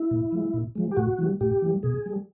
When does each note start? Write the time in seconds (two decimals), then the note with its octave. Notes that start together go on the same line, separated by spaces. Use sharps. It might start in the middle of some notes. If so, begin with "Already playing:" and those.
Already playing: E4
0.11 A#2
0.32 F3 G#3
0.54 A#2
0.75 F3 G#3
0.91 G4
0.96 A2 F#4
1.19 E3 G3
1.41 A2 G4
1.62 E3 G3
1.83 B2 G#4
2.06 G3